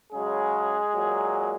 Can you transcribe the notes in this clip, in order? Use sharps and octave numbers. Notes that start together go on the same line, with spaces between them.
C#3 F#3 G#3 G#4
A#2 F#3